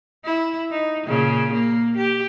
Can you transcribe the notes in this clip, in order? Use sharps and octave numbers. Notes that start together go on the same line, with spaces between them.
E4
D#4
A#2 C#3
A#3
G4